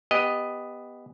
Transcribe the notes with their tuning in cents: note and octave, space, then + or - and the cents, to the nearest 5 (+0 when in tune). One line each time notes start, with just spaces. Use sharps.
B3 +0 G4 +20 D#5 +0